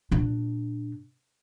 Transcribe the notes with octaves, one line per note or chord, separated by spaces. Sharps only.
A#2 D4